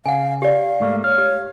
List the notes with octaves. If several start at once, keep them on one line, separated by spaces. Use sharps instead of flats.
C#3 F5 F#5 G#5
G4 D5 F5
G#2 A3 A#3
C#5 F5
G4